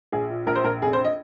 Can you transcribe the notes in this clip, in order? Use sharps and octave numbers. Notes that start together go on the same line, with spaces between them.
A#1 G#4
A#2
A#1 A#4
C5
A#1 A#4
F1 G#4
C5
D#5